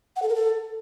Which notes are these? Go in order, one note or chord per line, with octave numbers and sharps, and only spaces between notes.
F#5
A4
A#4
A4